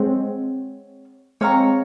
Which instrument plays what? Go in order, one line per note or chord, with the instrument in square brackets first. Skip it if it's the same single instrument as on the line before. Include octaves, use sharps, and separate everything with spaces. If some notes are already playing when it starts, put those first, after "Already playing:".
Already playing: [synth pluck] G#3 C4 [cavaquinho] C#5 F#5
[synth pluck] G#3 C4 [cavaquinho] C#5 F5 A#5 C#6